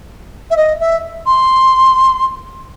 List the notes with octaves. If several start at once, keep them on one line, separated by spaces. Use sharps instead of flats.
E5
D#5
E5
C6